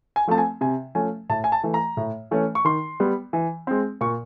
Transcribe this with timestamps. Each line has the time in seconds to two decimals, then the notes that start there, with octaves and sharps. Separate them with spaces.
0.16 G#5
0.27 F3 A3 C4 A5
0.38 G#5
0.61 C3 G#5
0.95 F3 A3 C#4 G#5
1.29 A2 A5
1.44 G#5
1.52 A5
1.63 E3 A3
1.74 A#5
1.97 A2
2.31 E3 A3 C#4
2.55 C#6
2.65 D#3 C6
3.00 G3 B3
3.33 E3
3.67 G#3 C4
4.01 A#2 C#6